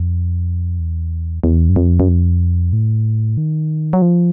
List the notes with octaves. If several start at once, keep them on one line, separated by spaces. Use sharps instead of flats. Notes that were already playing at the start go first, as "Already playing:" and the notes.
Already playing: F2
E2
E2
F#2
F2
F#2
F2
A2
D#3
F#3
F3